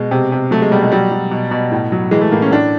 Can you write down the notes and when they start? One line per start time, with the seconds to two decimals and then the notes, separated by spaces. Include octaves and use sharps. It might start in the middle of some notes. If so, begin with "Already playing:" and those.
Already playing: B2 G#3
0.11 C3
0.32 C3
0.51 F#3 A3
0.62 G#3
0.71 B2 G3
0.82 G#3
0.92 F#3 G3
1.12 F#3
1.31 B2
1.51 B2
1.71 A2
1.92 F#3
2.11 E3 G#3
2.21 A3
2.31 A2 A#3
2.42 C#4
2.51 A2 D4